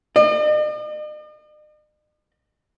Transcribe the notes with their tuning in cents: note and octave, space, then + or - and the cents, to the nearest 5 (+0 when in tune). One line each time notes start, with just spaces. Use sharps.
D#5 -45